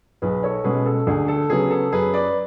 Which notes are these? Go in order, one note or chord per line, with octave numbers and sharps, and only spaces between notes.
B1 G#4 B4
A4 C#5
B2 G#3 C#4 G#4 B4
A4
D2 G#4
A4
C#3 F#3 B3 G#4
A4
F#2 G#4 B4
B4 D5